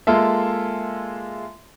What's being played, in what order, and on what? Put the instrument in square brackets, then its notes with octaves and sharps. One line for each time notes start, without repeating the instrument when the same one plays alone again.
[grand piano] G#3 A#3 F4 A4 E5